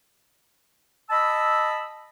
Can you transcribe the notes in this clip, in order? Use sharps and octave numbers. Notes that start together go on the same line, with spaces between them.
D#5 A5 B5 E6